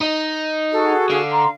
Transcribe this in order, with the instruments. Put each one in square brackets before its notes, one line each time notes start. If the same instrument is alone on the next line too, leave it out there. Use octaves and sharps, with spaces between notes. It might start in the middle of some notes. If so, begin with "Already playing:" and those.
[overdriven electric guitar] D#4
[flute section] F#4 G#4 [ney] A4
[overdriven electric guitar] D3 [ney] F5
[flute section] A#5 C6